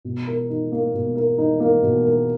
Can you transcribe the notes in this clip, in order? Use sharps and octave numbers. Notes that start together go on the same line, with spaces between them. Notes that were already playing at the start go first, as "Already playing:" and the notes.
B2
A#4
D#4
A#3
B2
A#4
D#4
A#3
B2
A#4